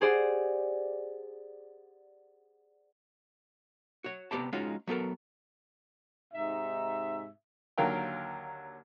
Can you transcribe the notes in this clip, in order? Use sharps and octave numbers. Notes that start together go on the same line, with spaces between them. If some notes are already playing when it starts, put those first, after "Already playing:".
G4 G#4 C5 D5 F#5
F#4 C#5
C3 F3 B3 G4 D5 A5
G#3 C#4 D#4 F4 F#4
F#3 B3 A4 A#4
G#2 C3 D#4 E5
D#2 D3 F#3 A#4 F5 G5